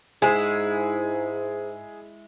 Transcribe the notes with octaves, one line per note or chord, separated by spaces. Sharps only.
G#2 G#3 E4 G#4